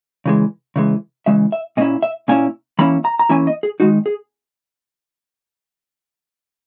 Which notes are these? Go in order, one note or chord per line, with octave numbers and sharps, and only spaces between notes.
C#3 E3 G#3
C#3 E3 G#3
C#3 E3 G#3 E5
E5
A#2 A#3 C#4 E4 D#5
E5
A#2 A#3 C#4 E4 G#5
E3 A#3 C#4 E4 B5
A#5
A#5
E3 A#3 C#4 E4 G#5
D#5
G#4
D#3 G#3 D#4 F#4
G#4